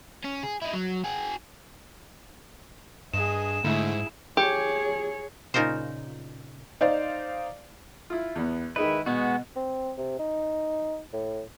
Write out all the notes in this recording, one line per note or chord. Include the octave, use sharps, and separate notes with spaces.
C#4
G#4
D#4 E4
F#3
F#4 G#4
G2 G#4 D#5 E7
G#2 D3 A3 E4 G#4
G4 G#4 C#5
A#2 C#3 D#4 F4 A#4 C5
D#4 C5 D5 F5
E4 F4
E2 B3
D#3 G#3 D#4 E4 B4
B2 G#3 B3 F#4
C4
C3
D#4
A2